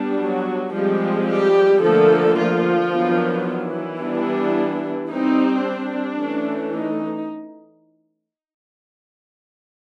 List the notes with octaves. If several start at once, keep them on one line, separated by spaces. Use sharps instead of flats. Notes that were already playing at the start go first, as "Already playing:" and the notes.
Already playing: G3 B3 D4
F#3 F#4
F3 G3 G#3 C4 G4
G3 G4
D3 F3 A3 A#3 A4
F3 F4
D#3 F#3 B3 D4
E3 E4
G3 B3 D4
G3 C4 D#4
D4
E3 A3 C#4
D#4